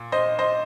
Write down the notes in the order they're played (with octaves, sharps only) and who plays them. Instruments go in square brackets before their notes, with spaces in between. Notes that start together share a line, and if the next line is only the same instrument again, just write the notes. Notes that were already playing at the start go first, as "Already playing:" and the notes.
Already playing: [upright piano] A#2
C5 D#5
C5 D#5